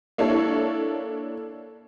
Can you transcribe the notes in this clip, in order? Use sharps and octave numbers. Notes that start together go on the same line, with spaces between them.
A#3 D4 E4 A4 C#5